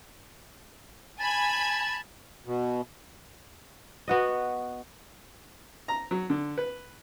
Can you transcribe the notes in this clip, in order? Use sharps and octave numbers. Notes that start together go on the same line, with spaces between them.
G#5 A5 B5 G#6
B2
B3 F#4 D#5
A#5
F#3
D3
B4